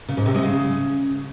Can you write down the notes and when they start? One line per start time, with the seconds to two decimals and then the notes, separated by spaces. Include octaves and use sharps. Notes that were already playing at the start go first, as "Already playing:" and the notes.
0.08 C#3
0.17 G#2
0.26 C3
0.34 G#3
0.43 C#3